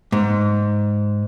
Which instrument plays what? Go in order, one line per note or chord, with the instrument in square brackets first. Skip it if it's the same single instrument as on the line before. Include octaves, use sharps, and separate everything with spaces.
[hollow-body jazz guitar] G#2